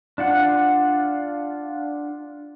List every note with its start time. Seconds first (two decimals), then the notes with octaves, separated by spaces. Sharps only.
0.18 D4 F4 F#5